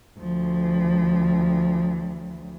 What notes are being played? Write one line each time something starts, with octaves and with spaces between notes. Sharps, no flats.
D2 F3